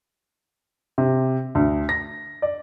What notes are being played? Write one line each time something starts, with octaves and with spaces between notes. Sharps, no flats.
C3
D2
A#6
D5